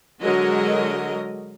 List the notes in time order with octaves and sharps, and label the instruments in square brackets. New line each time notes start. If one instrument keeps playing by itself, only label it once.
[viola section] D3 F#3 G#3 F#4 A#4 D#5